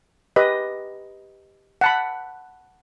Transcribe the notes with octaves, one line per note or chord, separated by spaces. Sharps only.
G4 B4 D#5
F#5 A5 B5